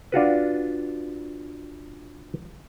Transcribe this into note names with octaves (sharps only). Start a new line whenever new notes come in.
D4 F4 F#4 B4